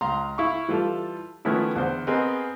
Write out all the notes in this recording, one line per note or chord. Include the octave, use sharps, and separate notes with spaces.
C#2 F5 A#5 C6
E4 F5 C#6
E3 G3 F4 A4
D#3 F3 A3 B3 C#4 E4
E2 D3 C5
B3 C4 G#4 A#4 D#5